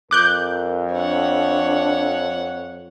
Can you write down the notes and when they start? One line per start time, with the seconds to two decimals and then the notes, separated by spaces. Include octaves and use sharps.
0.11 F2 A#4 D6 F#6 G6
0.94 D4 C#5 F#5